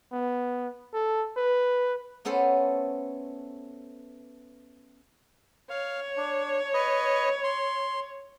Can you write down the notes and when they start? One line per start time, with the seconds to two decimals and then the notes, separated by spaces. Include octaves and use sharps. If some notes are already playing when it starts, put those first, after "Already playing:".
0.12 B3
0.93 A4
1.37 B4
2.25 A3 B3 C#4 A4 C5
5.70 C#5 F5
6.17 D4
6.74 B4 D#5
7.44 C6